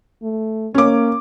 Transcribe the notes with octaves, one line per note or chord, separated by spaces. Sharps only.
A3
A#3 C#4 D6